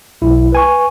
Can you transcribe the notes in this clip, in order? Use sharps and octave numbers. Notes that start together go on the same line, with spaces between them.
B1 E4
B4 G#5 C#6